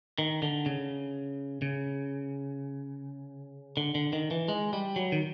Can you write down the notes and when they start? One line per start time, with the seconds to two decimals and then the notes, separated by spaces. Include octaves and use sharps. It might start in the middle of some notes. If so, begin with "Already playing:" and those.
0.18 D#3
0.42 D3
0.66 C#3
1.62 C#3
3.77 D3
3.95 D3
4.13 D#3
4.31 E3
4.48 G#3
4.73 G3
4.96 F#3
5.12 D#3